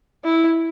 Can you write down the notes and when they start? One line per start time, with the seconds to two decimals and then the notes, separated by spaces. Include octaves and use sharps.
0.24 E4